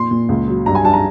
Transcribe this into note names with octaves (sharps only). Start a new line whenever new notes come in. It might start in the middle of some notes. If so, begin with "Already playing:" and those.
Already playing: A#2 C6
A#2
C#2
F#3
G2 A#5
G#5
G2 A5
A#5